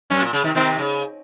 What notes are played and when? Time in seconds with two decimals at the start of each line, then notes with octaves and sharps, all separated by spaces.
0.10 F#2 C#4
0.22 A#2
0.33 C#3
0.44 C3 D#3
0.55 C3 D#3 C4
0.79 C#3